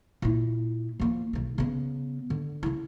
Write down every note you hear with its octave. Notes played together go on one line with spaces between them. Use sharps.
A#2 E4
F3 A#3
B1 D#3
C#3 B3
D3
C#3 E4